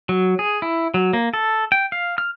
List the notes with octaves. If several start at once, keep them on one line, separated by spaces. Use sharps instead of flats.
F#3
G#4
E4
F#3
A#3
A4
G5
F5
F6